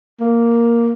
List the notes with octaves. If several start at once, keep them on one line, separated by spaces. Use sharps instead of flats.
A#3